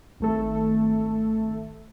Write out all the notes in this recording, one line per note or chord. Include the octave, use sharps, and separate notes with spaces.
G#1 A3 A4